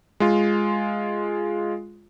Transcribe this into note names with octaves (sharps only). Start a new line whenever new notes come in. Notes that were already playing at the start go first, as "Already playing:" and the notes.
G#3 F4